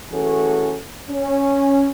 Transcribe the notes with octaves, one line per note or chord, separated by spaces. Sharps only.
E3 A3 C#4 F#4 G#4 A4
C#4